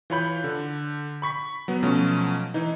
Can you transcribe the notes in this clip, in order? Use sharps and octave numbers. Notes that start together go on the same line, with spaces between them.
E3 F4 C#5 B5 G6
D3
B5 C#6 B6
F#3 B3
B2 F3 F#3 A3 C#4
E3 D#4